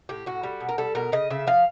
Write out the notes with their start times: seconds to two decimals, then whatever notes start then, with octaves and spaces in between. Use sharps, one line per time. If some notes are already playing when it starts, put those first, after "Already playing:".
0.09 A2 G4
0.26 A2 F#4
0.43 G3
0.60 B2
0.69 A#4
0.78 G3 A4
0.95 B2 A#4
1.12 C#3 D#5
1.30 C#3 E5
1.47 F3 F5